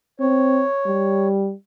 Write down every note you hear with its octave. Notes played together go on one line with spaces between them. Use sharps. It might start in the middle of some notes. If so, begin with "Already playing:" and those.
C4 C#5
G3